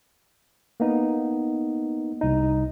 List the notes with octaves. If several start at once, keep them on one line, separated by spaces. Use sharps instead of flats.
A#3 B3 D#4
C2 D#4